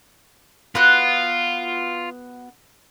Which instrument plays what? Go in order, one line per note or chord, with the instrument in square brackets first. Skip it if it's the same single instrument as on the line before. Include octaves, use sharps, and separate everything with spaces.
[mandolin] B3 F#4 F#6 [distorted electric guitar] F4